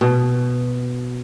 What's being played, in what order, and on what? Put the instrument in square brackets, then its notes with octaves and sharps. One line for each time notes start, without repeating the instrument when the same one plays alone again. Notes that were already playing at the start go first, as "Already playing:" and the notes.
[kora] B2